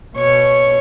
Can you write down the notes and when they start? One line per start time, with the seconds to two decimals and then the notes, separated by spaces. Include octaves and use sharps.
0.16 B2 C#5 C#6